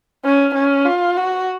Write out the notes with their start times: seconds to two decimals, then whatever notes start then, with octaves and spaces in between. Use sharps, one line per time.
0.25 C#4
0.55 C#4
0.86 F4
1.17 F#4